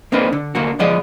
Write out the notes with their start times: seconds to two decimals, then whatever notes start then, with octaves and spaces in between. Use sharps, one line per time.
0.12 A#3 C4 D4 D#4 B4
0.33 D3
0.55 D#2 D3 A#3 F#4
0.79 D2 F3 G#3 D5 D#5 F#5